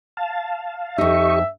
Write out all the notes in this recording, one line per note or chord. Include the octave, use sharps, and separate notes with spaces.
F5 A5
F2 D#4 G4 D#5 E5 C#6